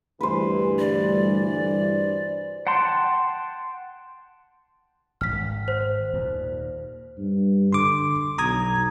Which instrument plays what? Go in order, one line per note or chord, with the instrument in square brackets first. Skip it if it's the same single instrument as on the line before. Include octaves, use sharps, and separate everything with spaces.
[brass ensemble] D2 G2 E3 [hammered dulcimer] B4 C5
[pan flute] D5
[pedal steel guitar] F#5 G5 A5 C6
[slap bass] G#1 [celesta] F6 B6
[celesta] C5
[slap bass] D#2 A#2
[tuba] G2
[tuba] D3 [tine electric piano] C6 D6
[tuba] B1 [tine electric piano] A#5 D#6 G#6